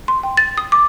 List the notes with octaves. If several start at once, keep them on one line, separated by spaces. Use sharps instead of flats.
C6
G5
A6
D#6
D6